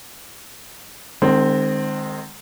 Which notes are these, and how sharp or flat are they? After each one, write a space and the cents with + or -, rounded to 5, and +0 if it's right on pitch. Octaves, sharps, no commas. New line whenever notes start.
D#3 -40 G#3 -10 C4 +0